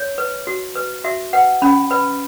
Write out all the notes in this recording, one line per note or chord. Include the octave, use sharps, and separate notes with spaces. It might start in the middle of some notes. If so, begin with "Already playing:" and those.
Already playing: C#5
B4
F#4
B4
F#4 E5
B4 F#5
C#4 B5
B4 B5